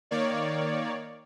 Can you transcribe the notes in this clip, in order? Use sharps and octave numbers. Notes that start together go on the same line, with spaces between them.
D#3 A#3 C#5 D5